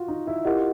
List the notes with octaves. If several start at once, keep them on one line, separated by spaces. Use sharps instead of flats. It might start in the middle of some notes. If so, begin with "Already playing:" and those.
Already playing: F4 F#4
D#4
E4
E4 F4 G4 A#4 D#5 F#5